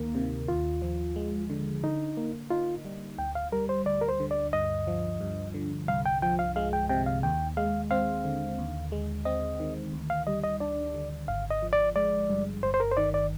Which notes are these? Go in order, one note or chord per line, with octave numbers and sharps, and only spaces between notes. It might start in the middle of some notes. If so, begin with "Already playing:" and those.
Already playing: D2 D#3 A#3
C3
D#2 F4
F3
G#3
D3
D3 D#4
A#3
D#4 F4
G3
D2 G5
F5
G3 A#4
C5
D2 D5
A#4
C5
D3
D5
G2 D#5
F3
G2
D3
C2 F5
G5
F3 G5
F5
G#3 F5
G5
C3 G5
F5
D#2 G5
G#3 F5
C4 F5
D3
D#2
G#3
C4 D#5
D#3
D2
F5
G3 D#5
D#5
D4 D5
D3
G#1 F5
D#5
F3
D5
G#3 D5
G2
G1 C5
C5
A#4
C5
D#3 D5
D5